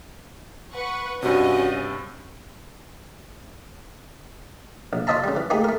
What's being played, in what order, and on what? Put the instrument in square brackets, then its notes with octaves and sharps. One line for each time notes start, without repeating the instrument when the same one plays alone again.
[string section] B4 F#5 C#6
[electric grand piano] G2 C3 [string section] C#4 D#5 [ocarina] F#4
[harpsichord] A#1
F4 C#5 D#5 E5 A5 A#5
C#3 G3
E3
A3 A#3 D#4 G4 G#4
A3 A#4